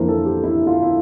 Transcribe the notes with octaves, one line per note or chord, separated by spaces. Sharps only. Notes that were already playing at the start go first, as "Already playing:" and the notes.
Already playing: F2 E3 A#3 D4 A#4 C5
A4
G4
E4
F4
E4